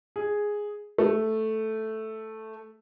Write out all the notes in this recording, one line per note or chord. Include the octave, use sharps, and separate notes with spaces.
G#4
A3